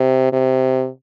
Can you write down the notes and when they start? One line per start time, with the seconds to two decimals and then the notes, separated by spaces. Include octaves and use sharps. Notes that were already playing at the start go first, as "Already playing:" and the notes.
Already playing: C3
0.33 C3